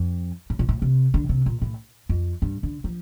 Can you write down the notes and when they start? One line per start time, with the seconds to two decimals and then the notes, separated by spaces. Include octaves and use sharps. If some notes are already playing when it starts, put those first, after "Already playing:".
Already playing: F2
0.50 A2
0.59 A#2
0.69 A2
0.82 C3
1.14 D3
1.29 C3
1.46 A#2
1.62 A2
2.09 F2
2.42 G2
2.63 D3
2.84 F3